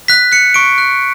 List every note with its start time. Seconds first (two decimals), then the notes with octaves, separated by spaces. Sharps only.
0.08 F#6 B6
0.32 F#6 C#7
0.54 C#6 D7
0.78 F#6